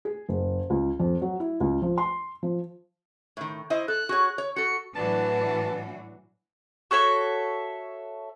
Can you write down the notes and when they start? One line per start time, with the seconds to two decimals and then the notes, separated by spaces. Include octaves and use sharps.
0.05 G#4
0.29 F#1
0.70 C#2
1.00 F2
1.22 F#3
1.40 E4
1.60 C#2
1.82 F3
1.98 C6
2.43 F3
3.37 A2 D#3
3.70 E4 C5 D#5
3.88 A4 F#6
4.09 F#4 G#4 C#5
4.38 C#5
4.56 F#4 A4 C#7
4.95 A2 E3 F#3 D4 F#4 B4 A5
6.91 F#4 A4 C#5 E5